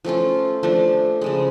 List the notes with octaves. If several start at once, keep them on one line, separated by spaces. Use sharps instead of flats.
F3 A3 C#4 F4
F3 A3 D4
C#3 F3 G#3